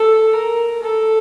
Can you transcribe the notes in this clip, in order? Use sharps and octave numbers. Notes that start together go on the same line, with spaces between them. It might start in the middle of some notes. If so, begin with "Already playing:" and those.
Already playing: A4
A#4
A4